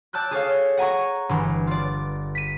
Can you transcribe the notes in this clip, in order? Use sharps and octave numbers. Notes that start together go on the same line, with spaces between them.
D5 A5 E6 F#6 G6
G#4 A4 C#5 F5
F#5 G#5 A#5 C#6
G1 E3
F4 D5
B6 D#7